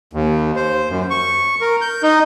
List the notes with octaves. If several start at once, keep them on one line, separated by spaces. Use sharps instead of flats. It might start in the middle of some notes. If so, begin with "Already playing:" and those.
D#2
C5
F#2
C#6
A#4
G6
D#4